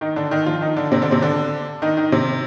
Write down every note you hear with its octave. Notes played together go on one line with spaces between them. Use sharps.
D#3 D#4
D3 D4
D#3 D#4
F3 F4
D#3 D#4
D3 D4
C3 C4
D3 D4
C3 C4
D3 D4
D#3 D#4
D#3 D#4
C3 C4